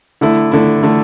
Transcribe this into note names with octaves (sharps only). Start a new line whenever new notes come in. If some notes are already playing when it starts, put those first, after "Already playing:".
D3 A3 E4
D3 A3 E4
D3 A3 E4